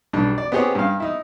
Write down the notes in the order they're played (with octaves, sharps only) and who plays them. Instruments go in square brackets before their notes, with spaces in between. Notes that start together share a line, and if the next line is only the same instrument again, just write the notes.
[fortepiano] B1 G3 D4
D5
B3 C4 G4 G#4 C#5
G2 F5
D#4 E4